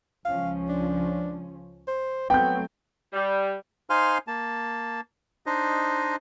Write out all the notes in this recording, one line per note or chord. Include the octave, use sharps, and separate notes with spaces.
C#2 F3 C#4 F5
D4
C5
F#3 A3 B3 C4 G5 G6
G3
D#4 C5 F5 G#5 C6 F6
A#3 A5
D4 D#4 C5 D#5